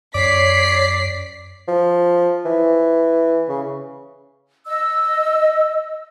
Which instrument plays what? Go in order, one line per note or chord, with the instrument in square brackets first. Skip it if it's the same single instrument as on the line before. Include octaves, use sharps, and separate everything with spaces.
[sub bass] F#2 [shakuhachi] C#5 [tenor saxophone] D5 [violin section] B6 C7
[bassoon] F3
E3
C#3
[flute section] D#5 E6